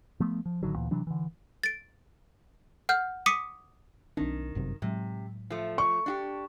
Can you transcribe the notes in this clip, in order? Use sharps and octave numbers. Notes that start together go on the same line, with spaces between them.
F3 A3 B3
F3
A1 D3 D#3 F#3
D2 A#2 E3
C3 E3 F#3 D4
D3 E3
A6 D7
F#5 F6 G6
D6 D#6 B6 C#7 D#7
B1 D#3 C4 D4
G1 F#2 C3
A2 C3 F#3 G#3
F3 A3
C#6
D4 F#4 G4